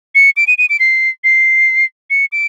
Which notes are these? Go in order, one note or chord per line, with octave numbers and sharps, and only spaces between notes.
C#7
D7
D#7
D#7
D7
C7
C7
C#7
D7